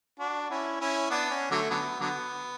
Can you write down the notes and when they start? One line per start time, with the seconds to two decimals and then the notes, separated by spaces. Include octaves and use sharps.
0.20 D4 F#4
0.50 C#4 E4
0.81 C#4 E4
1.10 B3 D4
1.31 C#4
1.51 D3 F#3 A3
1.70 D3 F#3 B3
2.01 D3 F#3 B3